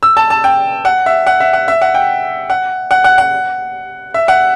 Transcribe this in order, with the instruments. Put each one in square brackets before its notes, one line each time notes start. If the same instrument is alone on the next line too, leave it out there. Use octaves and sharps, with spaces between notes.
[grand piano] E6
A5
A5
G5
F#5
E5
F#5
E5
F#5
E5
F#5
G5
F#5
F#5
F#5
F#5
E5
F#5